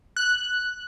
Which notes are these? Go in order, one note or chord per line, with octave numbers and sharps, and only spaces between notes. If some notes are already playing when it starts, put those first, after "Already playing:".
F#6